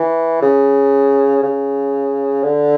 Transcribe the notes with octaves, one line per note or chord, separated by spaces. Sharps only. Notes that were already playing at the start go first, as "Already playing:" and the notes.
Already playing: E3
C#3
C#3
D3